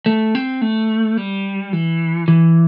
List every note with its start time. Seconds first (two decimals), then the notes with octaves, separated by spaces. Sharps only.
0.06 A3
0.35 C4
0.62 A3
1.17 G3
1.73 E3
2.28 E3